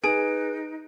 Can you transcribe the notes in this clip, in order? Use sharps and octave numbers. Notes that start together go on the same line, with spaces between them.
D#4 G#4 B4 D7